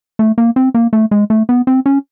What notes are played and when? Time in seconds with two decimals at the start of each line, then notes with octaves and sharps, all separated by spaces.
0.19 A3
0.38 A#3
0.56 C4
0.74 A#3
0.93 A3
1.11 G#3
1.30 A3
1.49 B3
1.67 C4
1.86 C#4